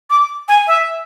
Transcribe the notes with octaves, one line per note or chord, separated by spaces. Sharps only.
D6
G#5
E5